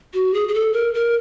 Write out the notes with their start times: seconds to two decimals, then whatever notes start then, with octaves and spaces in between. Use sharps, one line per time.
0.14 F#4
0.34 G#4
0.48 G#4
0.54 A4
0.73 A#4
0.94 A#4